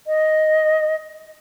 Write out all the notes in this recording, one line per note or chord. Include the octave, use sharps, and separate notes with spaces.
D#5